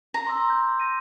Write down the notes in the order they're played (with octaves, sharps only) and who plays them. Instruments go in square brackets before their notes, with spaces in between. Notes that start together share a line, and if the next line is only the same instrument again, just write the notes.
[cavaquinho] A#5
[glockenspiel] C6 D6 E6
G6
A#6 D#7